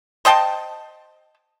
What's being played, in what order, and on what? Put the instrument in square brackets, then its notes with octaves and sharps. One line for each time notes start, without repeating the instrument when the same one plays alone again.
[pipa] C5 D#5 G5 A5